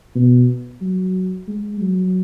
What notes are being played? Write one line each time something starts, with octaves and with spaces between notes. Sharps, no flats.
B2
F#3
G#3
F#3